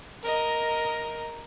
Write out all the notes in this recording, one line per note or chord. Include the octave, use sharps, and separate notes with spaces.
A#4 D#5